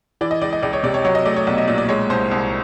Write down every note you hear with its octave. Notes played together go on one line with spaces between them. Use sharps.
E3 D5
D#5
C#2 D5
D#5
C#2 D5
C#5
C3 D5
C#5
F#3 C#5
D#5
A3 D5
C#5
B1 D5
D#5
A#2 D5
D5
G#3 C#5
C2 C5
C2